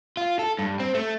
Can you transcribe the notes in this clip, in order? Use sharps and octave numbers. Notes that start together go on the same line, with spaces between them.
F4
A4
G2
C4
A3